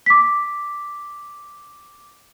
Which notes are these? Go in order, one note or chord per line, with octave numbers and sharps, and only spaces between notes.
D6 B6